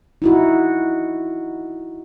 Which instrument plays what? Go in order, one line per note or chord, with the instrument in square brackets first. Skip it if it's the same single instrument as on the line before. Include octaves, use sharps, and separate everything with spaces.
[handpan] D#4 E4 F#4